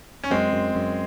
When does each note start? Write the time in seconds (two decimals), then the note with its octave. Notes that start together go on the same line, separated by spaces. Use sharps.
0.24 C#4
0.31 F#2 G#3 C4
0.53 F#2
0.75 F#2